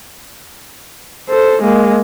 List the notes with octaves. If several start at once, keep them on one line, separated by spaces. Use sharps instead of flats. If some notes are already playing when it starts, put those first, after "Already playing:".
A4 C5
G#3 A#3